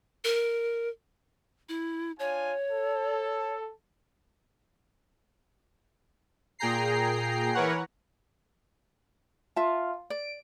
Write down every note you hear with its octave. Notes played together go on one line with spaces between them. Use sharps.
A#4
E4
D4 F4 C#5 G#5
A4
A#2 G#4 G5 A#5 C7
E3 A#4 B4 C#5 F#5
F4 E5 A5
D5 D7